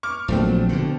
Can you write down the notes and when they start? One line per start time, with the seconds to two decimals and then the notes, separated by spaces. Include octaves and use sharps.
0.03 C#6 D6 F6
0.28 A#1 C#3 F3 F#3 A3 C4
0.69 B2 D3